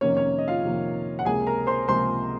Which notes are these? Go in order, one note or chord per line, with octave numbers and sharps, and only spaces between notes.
F2 C3 D#3 A#3 C#4 C#5
C#4 C#5
D#5
F4 F5
F2 C3 D#3 A#3
F#5
C#2 C3 F3 A#3 G#4 G#5
A#4 A#5
C5 C6
C#2 C3 F3 A#3 C5 C6